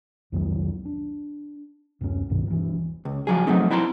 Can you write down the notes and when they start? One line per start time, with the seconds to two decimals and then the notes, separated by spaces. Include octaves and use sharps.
0.32 C2 F2 D#3 F#3
0.85 D4
2.01 D1 F#2 A3 C#4
2.29 C2 G2 B2 D#3
2.47 D#1 E3
3.05 C#2
3.27 F3 F#3 G#4
3.47 F#3 A3 C4 D#4
3.71 C4 E4 A5 A#5 C6